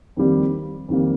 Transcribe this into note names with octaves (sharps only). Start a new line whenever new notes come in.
F2 D#3 G3 A#3
F2 D#3 G3 A#3